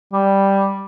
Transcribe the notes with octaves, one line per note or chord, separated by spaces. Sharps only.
G3